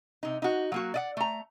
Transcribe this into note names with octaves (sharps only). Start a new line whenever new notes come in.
C3 D#4
D#4 F#4
F#3 A#3 F#4
D5 D#5 F#5
A3 A#5